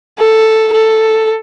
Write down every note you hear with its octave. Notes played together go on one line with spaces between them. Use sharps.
A4
A4